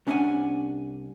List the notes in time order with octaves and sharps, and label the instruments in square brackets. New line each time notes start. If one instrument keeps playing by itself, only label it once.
[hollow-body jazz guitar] C2 C#4 D4 D#5 F#5 G#5